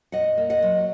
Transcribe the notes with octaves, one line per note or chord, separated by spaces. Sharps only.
A#2 D#5 F#5
A#3
D#5 F#5
F#3